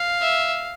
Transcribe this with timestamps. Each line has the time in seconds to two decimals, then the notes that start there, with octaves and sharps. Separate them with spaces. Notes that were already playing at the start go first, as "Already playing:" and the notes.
Already playing: F5
0.22 E5